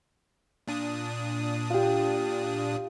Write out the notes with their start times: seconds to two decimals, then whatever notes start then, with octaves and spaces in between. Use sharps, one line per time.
0.68 A#2 D4 D#6
1.70 F4 G4